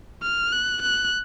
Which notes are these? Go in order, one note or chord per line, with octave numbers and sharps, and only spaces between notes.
F6
F#6
F#6